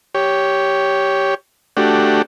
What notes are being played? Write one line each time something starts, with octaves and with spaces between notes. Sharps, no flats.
G4 C#5
A3 D4 F#4 G4